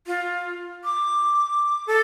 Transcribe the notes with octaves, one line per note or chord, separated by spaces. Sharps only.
F4
D6
A4